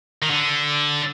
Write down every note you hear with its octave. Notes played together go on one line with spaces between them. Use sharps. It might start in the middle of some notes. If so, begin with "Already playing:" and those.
D#3
D3